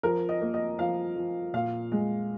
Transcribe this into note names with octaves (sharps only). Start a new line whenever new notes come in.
F3 A#4
D#5
A#3
D#5
F3 F5
F3
A#2 F5
G#3